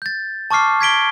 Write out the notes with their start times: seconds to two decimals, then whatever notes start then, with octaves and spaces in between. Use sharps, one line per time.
0.02 G6 A6
0.51 A5 C#6 D6 F6 C7
0.81 G#6 B6 D7 G7